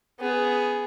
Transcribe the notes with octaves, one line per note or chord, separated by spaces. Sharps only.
B3 G#4